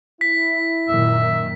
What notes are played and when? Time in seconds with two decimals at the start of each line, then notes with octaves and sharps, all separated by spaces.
0.21 E4 B6
0.89 F#2 A#2 D#3 E5